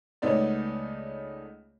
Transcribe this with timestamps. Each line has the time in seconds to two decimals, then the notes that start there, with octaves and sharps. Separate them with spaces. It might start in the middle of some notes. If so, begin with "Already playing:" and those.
0.22 C#2 A3 B3 D#4 C#5 D5